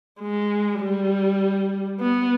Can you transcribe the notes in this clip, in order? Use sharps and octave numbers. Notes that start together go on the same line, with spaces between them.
G#3
G3
B3